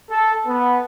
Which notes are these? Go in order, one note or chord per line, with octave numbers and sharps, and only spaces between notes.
A4
B3